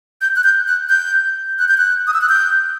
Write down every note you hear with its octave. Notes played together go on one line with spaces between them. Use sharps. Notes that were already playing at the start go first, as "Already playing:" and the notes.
G6
F#6
G6
F#6
G6
F#6
G6
F#6
D#6
E6
F#6
G6